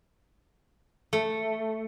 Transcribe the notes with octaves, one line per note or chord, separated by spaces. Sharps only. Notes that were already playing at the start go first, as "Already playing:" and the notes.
A3